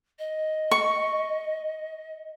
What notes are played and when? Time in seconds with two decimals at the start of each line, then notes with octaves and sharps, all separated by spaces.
0.19 D#5
0.71 C#6